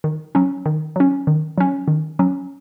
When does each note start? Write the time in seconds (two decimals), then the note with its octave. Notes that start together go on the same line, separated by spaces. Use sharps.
0.04 D#3
0.35 F#3 C#4
0.66 D#3
0.96 F#3 C#4
1.27 D#3
1.58 F#3 C#4
1.88 D#3
2.19 F#3 C#4